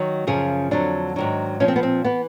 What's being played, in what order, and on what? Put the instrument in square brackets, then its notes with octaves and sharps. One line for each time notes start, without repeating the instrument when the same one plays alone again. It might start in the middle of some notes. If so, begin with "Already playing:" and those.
Already playing: [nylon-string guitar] D#3 F#3
F#2 C#3 F3 G#4
F2 D3 F#3 D4
G#2 D#3 F#3
A#2 F3 C#4
C4
B3
C4
E3 B3